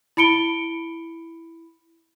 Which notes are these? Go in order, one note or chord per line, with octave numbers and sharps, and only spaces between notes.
E4 B5 C#7 D7 G7